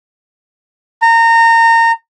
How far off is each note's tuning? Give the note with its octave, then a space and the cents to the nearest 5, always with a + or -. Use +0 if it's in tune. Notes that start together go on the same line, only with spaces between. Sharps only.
A#5 -25